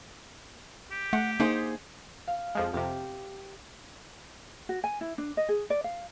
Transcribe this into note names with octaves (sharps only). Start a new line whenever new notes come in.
G4
A3 F#5
A#3 D#4 G#4 C5
F5
F2 F3 G#3
F2 C3 G4
F#4
G#5
E4
D4
D#5
G#4
D5
F5